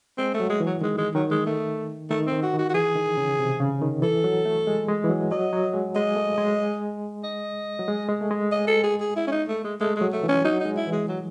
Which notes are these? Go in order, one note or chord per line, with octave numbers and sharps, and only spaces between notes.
G#3 C4
A3
F#3
G#3
E3
F#3
D#3 G#3
G#3
D#3 F#3
G#3
A3
D#3 A3
C4
D#3
F#4
D#3 F#4
F#4
E3 G#4
D#3
C#3
C3
C#3
D#3
E3 A4
F#3
A3
G#3
G#3
E3
F#3
F#3 D#5
F#3
G#3
G#3 D#5
A3
G#3
D#5
F#3
G#3
G#3
A3
G#3
D#5
A4
G#4
G#4
E4
C#4
D#4
A3
G#3
G#3 A3
G#3
F#3
A3
E3 C#4
F#3 D#4
D#4
G#3
E4
E3
G#3
F#3